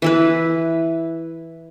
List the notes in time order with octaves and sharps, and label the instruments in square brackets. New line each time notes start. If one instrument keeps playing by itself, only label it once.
[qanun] E3 E4 B4